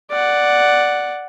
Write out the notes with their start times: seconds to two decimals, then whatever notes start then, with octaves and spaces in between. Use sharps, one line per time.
0.11 D5 F#5